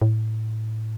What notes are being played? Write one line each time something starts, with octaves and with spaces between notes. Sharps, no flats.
A2